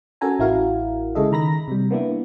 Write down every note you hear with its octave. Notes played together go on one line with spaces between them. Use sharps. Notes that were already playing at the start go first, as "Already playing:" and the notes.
C#4 F#4 A4 A#4 G#5 A#5
A1 E4 F#4 A#4 F5
C#3 G#3 A4 D#5 E5
D#3 A#5 B5 A#6
C3 G3
A#3 B3 D4 E4